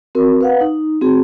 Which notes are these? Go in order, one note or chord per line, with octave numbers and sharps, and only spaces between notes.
C4 F#4 A#4
B4 F5 F#5
D#4
C4 F#4 G#4